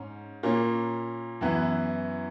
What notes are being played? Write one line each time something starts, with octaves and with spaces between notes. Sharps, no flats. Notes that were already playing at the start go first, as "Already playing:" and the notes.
Already playing: G#2 C#4
A#2 A#3 C#4
F#2 E3 B3 E4